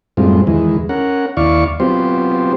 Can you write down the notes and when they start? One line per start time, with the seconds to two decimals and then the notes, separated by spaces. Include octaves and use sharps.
0.17 F#2 A2 G3 G#3 C4 F4
0.47 E2 D#3 E3 G#3
0.89 C#4 A#4 F#5
1.37 D#2 E4 D5 F5 C#6
1.80 F#3 B3 C4 F4 G4 C5